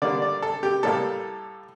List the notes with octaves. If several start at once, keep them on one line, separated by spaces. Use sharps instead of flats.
D3 G3 A#3 D5
D5
A4
G4
A2 G3 A#3 A4